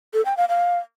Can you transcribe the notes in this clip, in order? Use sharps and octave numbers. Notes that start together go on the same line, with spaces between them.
A4
G5
F5
F5